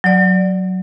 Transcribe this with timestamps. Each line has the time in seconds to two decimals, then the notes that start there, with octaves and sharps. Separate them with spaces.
0.04 F#3 D5